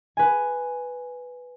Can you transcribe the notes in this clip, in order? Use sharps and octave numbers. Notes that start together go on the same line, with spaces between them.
B4 G#5